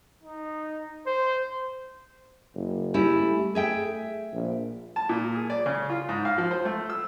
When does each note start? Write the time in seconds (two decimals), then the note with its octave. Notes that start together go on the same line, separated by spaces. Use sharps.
0.24 D#4
1.07 C5
2.55 F#1
2.94 G3 C#4 E4
3.23 A3
3.55 G#4 E5 G5
4.33 A#1
4.96 A5
5.09 A#2
5.36 G#4
5.50 D5
5.66 C#3
5.90 F4
6.09 G#2
6.25 F5
6.38 F3
6.51 C5
6.65 A3
6.90 E6